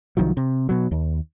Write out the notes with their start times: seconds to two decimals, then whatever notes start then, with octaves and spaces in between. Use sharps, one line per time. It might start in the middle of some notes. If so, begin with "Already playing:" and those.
0.17 C2 D#3 F3 F#3
0.37 C3
0.69 B2 F#3
0.91 D#2